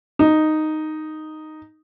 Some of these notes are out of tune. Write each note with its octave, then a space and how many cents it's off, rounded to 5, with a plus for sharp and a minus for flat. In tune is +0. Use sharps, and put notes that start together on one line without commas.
D#4 -5